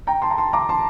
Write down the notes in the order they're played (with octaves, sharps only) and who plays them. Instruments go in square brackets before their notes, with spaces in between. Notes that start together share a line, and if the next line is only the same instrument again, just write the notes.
[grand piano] G5 A#5
A5 C6
A#5
A5 C6
A#5 D6
A5 C6